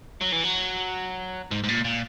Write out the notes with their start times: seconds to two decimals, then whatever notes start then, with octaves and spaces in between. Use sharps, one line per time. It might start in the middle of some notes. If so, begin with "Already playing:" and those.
0.21 F#3
0.32 E3
0.44 F#3
1.51 G#2
1.64 G#2
1.69 A#2
1.85 A#2